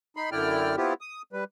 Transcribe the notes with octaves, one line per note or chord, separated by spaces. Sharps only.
D#4 B5 C6
F#2 D3 E4 D5 G5 F6
B3 C4 E4 F4 G4
D#6
G3 B4